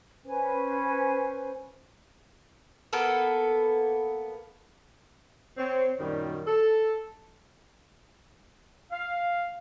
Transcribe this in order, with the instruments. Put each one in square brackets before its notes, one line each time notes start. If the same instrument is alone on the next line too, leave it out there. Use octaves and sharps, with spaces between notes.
[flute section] C#4 B4 C5 G#5
[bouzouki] A#3 B3 A4
[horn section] C4 C#5
F#2 A#2 D#3 F#3 G3
A4
[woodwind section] F5